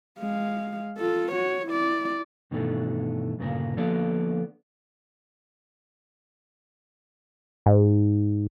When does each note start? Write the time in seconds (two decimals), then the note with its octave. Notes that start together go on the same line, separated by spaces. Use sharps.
0.19 G#3 F5
0.98 F4 A4
1.32 F#4 C#5
1.67 E4 D5
2.51 G2 B2 D#3 E3 A3 D4
3.39 D2 G2 A#2 C#3 A#4
3.77 D3 F3 A#3 B3 A4 D5
7.66 G#2